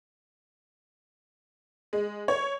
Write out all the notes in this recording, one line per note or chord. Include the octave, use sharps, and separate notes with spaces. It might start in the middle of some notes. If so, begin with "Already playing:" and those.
G#3
C#5